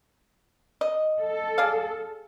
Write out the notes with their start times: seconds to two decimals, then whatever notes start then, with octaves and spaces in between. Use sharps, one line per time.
0.81 D#5
1.20 A4
1.58 G#4 D5 F5